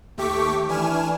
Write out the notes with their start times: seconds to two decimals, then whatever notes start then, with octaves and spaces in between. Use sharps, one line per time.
0.17 D#2 A3 G4 C#6 D6 B6
0.68 E3 D4 G#5 F6 E7